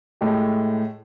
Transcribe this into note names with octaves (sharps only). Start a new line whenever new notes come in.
A2 G#3 A3 G4